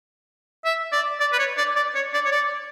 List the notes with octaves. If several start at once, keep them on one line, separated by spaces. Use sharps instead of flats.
E5
D5
D5
B4
C#5
D5
D5
C#5
D5
C#5
D5